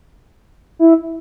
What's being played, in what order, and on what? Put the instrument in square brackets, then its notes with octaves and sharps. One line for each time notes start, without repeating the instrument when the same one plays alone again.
[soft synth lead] E4